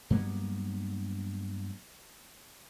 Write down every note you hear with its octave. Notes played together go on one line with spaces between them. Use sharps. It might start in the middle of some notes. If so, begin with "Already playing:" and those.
G2 F#3 A#3 B3